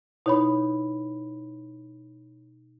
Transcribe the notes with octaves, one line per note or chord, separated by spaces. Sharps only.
B2 D#4 E4 C#5 B5